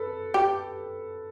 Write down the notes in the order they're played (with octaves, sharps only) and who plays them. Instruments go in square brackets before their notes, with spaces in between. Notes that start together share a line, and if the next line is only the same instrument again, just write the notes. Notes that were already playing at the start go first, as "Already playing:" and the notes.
Already playing: [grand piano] A4 B4
[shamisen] G4